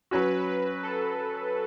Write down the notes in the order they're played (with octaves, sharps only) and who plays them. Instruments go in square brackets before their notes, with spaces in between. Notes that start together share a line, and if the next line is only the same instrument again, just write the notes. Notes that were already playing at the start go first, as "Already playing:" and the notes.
[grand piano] F#3 C#4 F#4 [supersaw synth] B4
[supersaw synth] A4